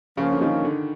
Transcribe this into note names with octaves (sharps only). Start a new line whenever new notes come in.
C#3 F3 A#3 C#4
D3
D#3
D3